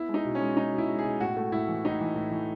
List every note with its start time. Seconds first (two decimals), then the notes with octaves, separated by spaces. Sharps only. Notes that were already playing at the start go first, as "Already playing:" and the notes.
Already playing: B3 E4
0.09 G#3
0.14 D#4
0.25 B2
0.35 C#4
0.41 G#3
0.57 G#3 D#4
0.73 B2
0.78 E4
0.89 G#3
0.99 G#4
1.05 B2
1.20 A2 F#4
1.36 A3
1.52 A2 E4
1.69 E3
1.85 A2 D#4
2.01 E3
2.16 A2
2.32 E3